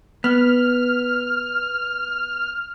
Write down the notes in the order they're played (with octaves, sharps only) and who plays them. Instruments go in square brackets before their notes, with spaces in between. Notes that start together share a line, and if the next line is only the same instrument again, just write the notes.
[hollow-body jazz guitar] B3 [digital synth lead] F6